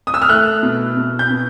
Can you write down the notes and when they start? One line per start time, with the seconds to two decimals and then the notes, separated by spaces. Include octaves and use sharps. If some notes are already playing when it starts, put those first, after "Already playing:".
0.07 D#6
0.14 E6
0.22 F6
0.29 A3 F#6
0.63 B2
0.97 B2
1.19 G6
1.30 B2